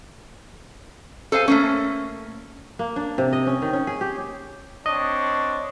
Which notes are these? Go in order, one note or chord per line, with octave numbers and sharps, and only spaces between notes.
A4 C5 F5 G#5
A3 A#3 C#4
A#3
D4
C3
D#5
C#4
D#3
C#4
G#4
G4
C4 D4 C#5 D#5